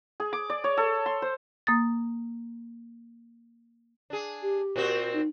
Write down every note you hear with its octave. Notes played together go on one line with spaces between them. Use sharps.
G#4
D6
D5
C#5
A4
C6
C5
A#3 D#6 A6
D4 G#4
G4
A#2 C4 F#4
D#4